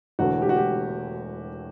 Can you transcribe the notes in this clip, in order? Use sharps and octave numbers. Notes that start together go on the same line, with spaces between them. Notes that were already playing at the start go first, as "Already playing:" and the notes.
E1 E2 D3 A3 F#4
G4
F#4
G4